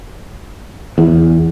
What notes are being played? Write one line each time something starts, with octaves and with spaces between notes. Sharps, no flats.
E2